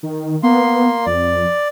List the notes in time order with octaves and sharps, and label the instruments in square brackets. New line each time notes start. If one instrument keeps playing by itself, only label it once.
[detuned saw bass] D#3
[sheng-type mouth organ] A#3 C6 [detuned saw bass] B3
[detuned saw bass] F2 [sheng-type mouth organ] D5